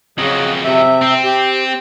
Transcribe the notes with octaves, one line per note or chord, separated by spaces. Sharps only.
F2 C#3 F#3 D#5
C3 E5
C4
G4